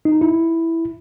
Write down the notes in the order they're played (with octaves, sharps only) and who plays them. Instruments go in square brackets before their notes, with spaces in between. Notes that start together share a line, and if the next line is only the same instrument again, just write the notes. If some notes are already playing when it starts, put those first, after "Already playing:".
[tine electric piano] D#4
E4